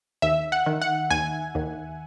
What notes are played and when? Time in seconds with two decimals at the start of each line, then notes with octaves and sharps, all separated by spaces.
0.22 D#2 E5
0.52 F#5
0.66 D#3
0.82 F#5
1.11 D#2 G#5
1.55 D#2